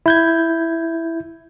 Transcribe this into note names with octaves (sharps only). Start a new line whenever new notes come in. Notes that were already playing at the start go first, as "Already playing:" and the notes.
E4 G6 G#6